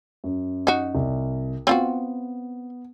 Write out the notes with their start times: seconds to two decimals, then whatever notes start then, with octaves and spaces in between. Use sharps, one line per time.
0.24 F#2
0.67 D#4 F#4
0.95 C2
1.67 B3 C4 F4 F#4